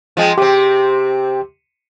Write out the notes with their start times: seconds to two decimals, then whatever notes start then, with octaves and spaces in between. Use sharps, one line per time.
0.17 F3 G#3 C4
0.38 C3 C4 G4